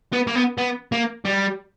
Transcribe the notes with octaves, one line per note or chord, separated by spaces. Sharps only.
B3
A#3
B3
B3
A#3
G3